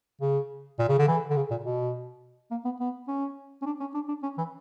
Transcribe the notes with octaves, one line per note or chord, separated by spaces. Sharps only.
C#3
A#2
C#3
D3
E3
D3
C#3
A#2
B2
A#3
B3
B3
C#4
C#4
D4
C#4
D4
D4
C#4
E3